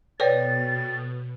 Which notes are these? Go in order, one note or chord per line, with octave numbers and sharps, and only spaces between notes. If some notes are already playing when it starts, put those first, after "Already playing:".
B2 A4 B4 C#5 D5 G5 A6